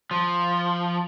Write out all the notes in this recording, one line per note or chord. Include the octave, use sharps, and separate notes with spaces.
F3